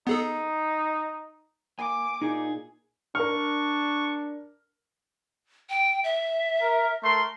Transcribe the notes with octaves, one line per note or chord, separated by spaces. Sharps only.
B3 D#4 G#4 A4
A#3 G#5 D6
A#2 D#4 G#4
D4 A#4 C#6 F6
G5
E5
A#4
A3 A#4 C6